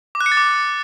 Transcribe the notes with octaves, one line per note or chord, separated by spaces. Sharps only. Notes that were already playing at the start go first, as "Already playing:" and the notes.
D6
F#6
C#7
A6
D6